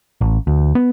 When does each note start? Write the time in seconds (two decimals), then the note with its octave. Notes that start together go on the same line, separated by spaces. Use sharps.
0.21 A1
0.47 D2
0.75 B3